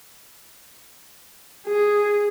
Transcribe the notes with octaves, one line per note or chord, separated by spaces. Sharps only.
G#4